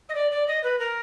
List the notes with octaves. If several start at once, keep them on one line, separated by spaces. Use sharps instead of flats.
D#5
D5
D5
D#5
B4
A#4